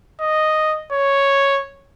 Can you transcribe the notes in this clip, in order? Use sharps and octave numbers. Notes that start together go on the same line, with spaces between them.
D#5
C#5